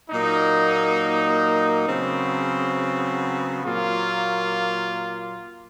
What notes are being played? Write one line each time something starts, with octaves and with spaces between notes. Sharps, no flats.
A#2 F#3 A#3 D#4
C#3 F#3 B3 C4
A#2 F#3 A#3 F4